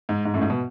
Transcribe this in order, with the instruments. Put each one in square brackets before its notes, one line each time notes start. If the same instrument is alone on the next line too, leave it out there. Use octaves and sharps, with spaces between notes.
[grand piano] G#2
G#2
F#2 A2
G#2
B2